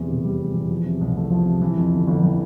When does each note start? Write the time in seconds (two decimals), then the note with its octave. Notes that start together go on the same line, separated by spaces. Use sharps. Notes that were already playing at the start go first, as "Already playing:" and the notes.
Already playing: E2 C3
0.09 F1
0.24 G3
0.39 C3
0.55 E2
0.69 F3
0.86 C3
1.01 C2
1.16 A3
1.30 F3
1.46 C3
1.62 E3
1.77 F2
1.93 G1
2.07 G1
2.23 E3